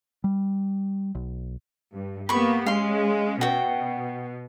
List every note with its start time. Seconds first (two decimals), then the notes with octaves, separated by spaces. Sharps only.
0.24 G3
1.15 B1
1.92 G2
2.29 A#3 B3 G4 B5 C#6
2.66 G#3 C#4 F5 C6
3.41 B2 F#4 G5